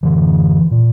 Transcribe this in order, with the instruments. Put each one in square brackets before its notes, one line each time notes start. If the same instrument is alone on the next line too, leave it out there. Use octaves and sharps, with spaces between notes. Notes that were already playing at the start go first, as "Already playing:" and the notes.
[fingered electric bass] F#2 D3 E3
A#2